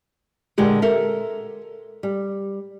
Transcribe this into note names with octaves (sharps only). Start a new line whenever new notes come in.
A#2 D3 G#3 G4
A4 A#4 E5
G3